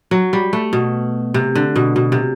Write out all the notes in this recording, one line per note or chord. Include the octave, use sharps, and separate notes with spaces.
F#3
G3
A3
B2
C3
D3
B2
B2
C3